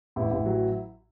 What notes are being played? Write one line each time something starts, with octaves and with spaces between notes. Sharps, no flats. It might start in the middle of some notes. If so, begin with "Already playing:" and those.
A1 E4
A1
F#3